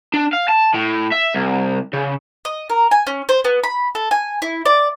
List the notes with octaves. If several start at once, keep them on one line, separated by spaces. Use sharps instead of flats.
D4
F5
A5
A2
E5
C2
C#3
D#5
A#4
G#5
C#4
C5
B3
B5
A4
G#5
E4
D5